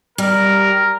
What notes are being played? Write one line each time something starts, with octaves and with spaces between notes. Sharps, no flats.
G3 A#4